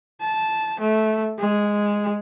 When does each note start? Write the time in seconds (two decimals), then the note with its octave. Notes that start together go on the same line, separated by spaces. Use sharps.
0.21 A5
0.80 A3
1.39 G#3